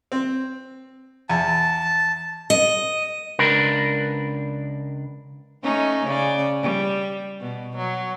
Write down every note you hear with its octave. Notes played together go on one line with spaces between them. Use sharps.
C4
E2 A5
D#5
C#2 D4 A#4 B4
A3 C#4 D#4
C#3 D5
G3
B2
F#3